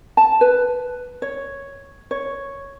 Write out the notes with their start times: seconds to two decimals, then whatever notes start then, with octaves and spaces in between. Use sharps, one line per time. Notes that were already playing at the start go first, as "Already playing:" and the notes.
0.17 A5
0.41 B4
1.22 C#5
2.11 C#5